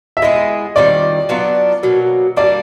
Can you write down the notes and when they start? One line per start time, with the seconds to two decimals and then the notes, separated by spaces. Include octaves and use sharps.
0.17 E5
0.22 G#3 B3 E4 G#4 D#5
0.76 D#3 G3 C4 F4 D5
1.29 F#3 B3 D4 F4
1.83 B2 F#3 A#3
2.36 G3 A#3 D4 D5